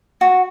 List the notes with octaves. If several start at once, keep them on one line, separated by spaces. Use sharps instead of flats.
F#4